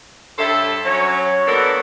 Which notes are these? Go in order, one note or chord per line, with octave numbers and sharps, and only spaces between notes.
G2 A4 C5 C#5 E5
F#3 C#4 C#5
A#3 B3 D4 F#4 A4 A#4